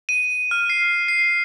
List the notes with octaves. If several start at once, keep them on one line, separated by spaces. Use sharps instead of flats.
D#7
F6
C7
C7